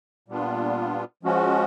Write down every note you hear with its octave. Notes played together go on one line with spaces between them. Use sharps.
A#2 G3 B3 D4 F4
F3 G#3 C#4 F#4